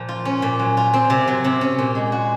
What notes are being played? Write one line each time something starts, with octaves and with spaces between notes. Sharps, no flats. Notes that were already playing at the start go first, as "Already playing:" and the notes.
Already playing: A#2 F3 A#3
F4
C#4
A#2
F#3
F4
C4
C3
F#3
C3
C#4
A#2
G#3
F#4